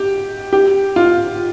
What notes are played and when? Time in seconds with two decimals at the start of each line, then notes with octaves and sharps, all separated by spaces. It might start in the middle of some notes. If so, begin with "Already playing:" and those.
Already playing: G4
0.53 G4
0.96 F4